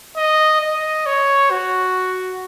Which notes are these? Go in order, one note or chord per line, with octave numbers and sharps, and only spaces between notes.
D#5
D#5
C#5
F#4